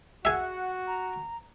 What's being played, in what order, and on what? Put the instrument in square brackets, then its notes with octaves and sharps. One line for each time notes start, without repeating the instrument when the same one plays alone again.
[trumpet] F#4 [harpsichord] G#4 E5 [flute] F#5 [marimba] E6
[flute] A#5